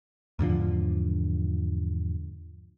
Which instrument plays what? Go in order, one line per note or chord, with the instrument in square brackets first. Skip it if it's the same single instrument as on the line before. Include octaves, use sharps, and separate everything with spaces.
[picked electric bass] E2 G#2 D3 F3